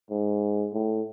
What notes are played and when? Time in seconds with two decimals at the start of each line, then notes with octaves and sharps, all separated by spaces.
0.10 G#2
0.74 A2